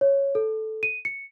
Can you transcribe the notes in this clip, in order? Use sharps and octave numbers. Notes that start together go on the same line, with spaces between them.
C#5
A4
D#7
C#7